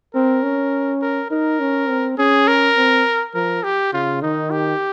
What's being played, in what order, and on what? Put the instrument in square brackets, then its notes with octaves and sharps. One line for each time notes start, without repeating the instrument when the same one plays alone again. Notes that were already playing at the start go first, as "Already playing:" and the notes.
[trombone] C4 [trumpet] A#4
[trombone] C#4
[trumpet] A#4
[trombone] D#4 [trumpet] A#4
[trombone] C#4
C4
[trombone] C#4 [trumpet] G#4
[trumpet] A#4
[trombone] C4
[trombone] F3 [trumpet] A#4
[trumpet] G4
[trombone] C#3 [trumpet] F4
[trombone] D#3 [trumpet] D#4
[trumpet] G4